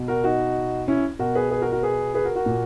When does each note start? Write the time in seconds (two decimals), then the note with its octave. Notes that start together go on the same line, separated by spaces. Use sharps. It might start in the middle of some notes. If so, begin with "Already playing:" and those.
Already playing: B2
0.08 F#4 A#4
0.24 D#4 F#4
0.88 C#4 E4
1.19 B2 F#4 A#4
1.35 G#4 B4
1.51 G#4 B4
1.61 F#4 A#4
1.72 F#4 A#4
1.83 G#4 B4
2.14 G#4 B4
2.25 F#4 A#4
2.35 F#4 A#4
2.46 A#2